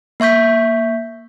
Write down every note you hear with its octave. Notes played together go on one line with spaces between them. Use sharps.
A#3 E5 C#6 G6 B6